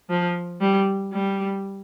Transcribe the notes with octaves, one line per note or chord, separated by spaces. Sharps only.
F3
G3
G3